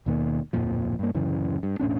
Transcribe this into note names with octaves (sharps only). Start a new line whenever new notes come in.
D#2 B2 D#3 A#3
D1 F2 A#2 F3
G2 A#3
D1 F#2 C#3 E3
G2
E1 A2 C#4 D4